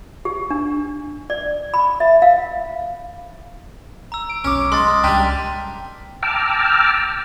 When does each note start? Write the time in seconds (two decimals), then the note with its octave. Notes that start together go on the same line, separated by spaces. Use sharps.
0.25 G4
0.50 D4
1.30 D5
1.74 B5
2.00 E5
2.22 F5
4.12 A#5 E6
4.29 D7
4.44 B1 C#4 D6
4.72 G#3 C6 A6
4.88 F6
5.04 C#2 G3 D4 G5 A#5 B6 D#7 F7
6.23 G5 A5 A#5 D6 E6 F6